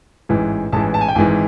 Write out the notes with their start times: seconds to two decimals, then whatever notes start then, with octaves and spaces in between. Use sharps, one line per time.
0.29 A1 G#2 E3
0.72 A1 G#2 E3 A5
0.94 A5
1.01 G#5
1.09 G5
1.15 G#1 G#2 E3 G#5